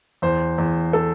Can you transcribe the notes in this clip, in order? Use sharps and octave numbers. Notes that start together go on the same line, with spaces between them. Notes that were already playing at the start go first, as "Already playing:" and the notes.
E2 C5
E2
A4